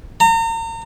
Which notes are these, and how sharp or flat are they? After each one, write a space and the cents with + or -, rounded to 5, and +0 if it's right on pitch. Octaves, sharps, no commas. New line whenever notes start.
A#5 -40